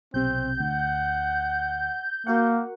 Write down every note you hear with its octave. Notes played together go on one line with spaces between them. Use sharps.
B1 C3 C4 G6
D2 F#5
A#3 F#4 A#4 F#5